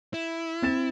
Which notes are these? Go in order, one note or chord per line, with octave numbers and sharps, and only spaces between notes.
E4
C4 A6 E7